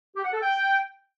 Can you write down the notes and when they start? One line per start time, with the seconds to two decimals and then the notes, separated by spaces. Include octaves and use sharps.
0.16 G4
0.25 F#5
0.33 A4
0.41 G5